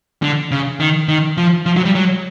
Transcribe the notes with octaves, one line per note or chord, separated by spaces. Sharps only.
D3
C#3
D#3
D#3
F3
F3
F#3
G3
F#3